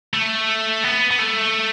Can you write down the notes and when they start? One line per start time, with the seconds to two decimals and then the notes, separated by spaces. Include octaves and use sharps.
0.14 A3
0.84 B3
1.11 B3
1.19 A3